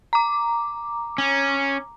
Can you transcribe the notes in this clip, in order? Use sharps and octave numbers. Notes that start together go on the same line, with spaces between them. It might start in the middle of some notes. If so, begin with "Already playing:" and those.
A#5 D6
C#4